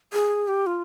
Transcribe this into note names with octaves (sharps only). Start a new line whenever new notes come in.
G#4
G4
F4